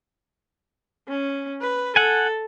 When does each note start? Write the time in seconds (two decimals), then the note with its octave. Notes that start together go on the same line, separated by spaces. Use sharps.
1.08 C#4
1.61 B4
1.96 A4 F#5 G#5